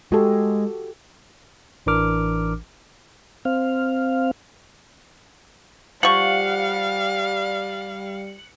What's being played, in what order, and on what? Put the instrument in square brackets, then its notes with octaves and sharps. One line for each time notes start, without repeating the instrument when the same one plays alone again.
[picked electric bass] G#3 [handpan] F#4 G4 A4
[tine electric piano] A1 E3 D4 A#4 D6 F6
[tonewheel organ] C4 F5
[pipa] F3 C#6 [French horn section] G3 [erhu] F5 [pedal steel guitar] F#5